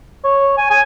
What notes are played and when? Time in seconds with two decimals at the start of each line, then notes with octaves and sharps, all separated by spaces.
0.24 C#5
0.58 G#5
0.70 G#5